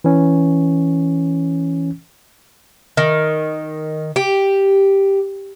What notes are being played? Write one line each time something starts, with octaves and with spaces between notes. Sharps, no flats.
E3 C#4
D#3
G4